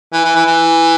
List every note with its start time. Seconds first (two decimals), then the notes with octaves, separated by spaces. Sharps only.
0.13 E3
0.24 E3
0.35 E3
0.46 E3